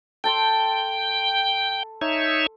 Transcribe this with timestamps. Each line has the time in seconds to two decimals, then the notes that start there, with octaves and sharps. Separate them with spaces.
0.24 A4 G5 A5 C6
2.01 D#4 C#5 E5